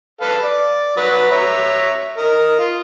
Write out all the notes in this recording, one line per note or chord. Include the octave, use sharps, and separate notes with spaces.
A4 B4 F5
D5
F#3 B4
C#5 E5 A#5
A#4 D#5
F4